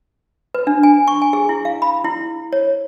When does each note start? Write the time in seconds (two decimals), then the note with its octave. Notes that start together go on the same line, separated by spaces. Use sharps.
0.55 B4
0.67 D4
0.83 G#5
1.08 C#6
1.22 G#5
1.33 G#4
1.49 E4
1.65 F5
1.82 B5
2.05 E4
2.53 C#5